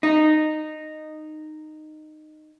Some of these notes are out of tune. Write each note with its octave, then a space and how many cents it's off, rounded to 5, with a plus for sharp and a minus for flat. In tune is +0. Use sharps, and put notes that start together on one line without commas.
D#4 -15